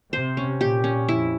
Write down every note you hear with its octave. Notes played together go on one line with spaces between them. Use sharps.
C3 C5
C#4
A#2 G4
C#4
F2 E4